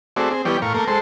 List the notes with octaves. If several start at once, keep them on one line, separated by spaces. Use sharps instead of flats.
A3 C4 F#4 G#4 D5 E5
C4 G#4
E3 G3 B3 C#5 D5 G5
A2 A#4 F5 C#6
A3 A#3 A#4
G#3 A4 C5